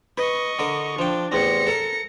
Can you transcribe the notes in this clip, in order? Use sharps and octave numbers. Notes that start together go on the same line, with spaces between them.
B4 D#5 C#6
D3 A#4
F3 D4 G5
A1 E2 C4 A#6 C#7
A4 A#4